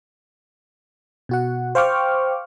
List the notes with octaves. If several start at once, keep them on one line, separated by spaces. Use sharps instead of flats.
B2 F#4 F#5
C5 F5 G5 C#6 D6 F6